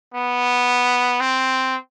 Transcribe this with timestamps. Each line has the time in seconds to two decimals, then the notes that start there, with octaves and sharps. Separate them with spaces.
0.14 B3
1.20 C4